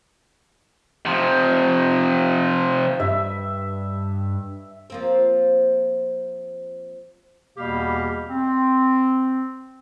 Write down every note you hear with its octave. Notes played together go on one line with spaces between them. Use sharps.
C3 F3
G2 E5
F3 A#3 C4
E2 B2 G3 A#3 G4 F5
C4